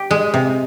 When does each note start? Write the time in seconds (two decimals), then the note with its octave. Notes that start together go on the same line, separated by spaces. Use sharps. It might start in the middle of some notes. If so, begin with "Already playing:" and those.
Already playing: G4
0.11 G#3
0.34 C3